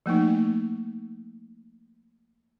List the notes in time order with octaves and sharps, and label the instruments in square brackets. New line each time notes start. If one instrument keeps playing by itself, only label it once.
[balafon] F3 A3 A#3 D#4